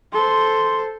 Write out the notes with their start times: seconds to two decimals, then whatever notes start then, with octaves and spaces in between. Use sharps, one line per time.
0.13 A4 C5 C6